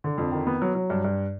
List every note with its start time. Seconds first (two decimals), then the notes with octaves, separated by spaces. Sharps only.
0.04 D3
0.18 F2
0.32 D#3
0.47 B3
0.62 F#3
0.75 F#3
0.90 G2
1.04 G2